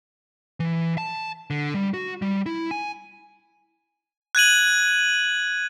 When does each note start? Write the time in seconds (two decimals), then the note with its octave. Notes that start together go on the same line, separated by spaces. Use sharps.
0.60 E3
0.98 A5
1.50 D3
1.74 G3
1.94 F#4
2.22 G3
2.46 E4
2.71 G#5
4.35 F#6 G#6 D#7 F#7